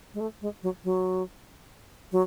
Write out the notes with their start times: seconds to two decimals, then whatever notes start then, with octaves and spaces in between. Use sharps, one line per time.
0.14 G#3
0.20 A3
0.41 G#3
0.63 F#3
0.84 F#3
2.12 F#3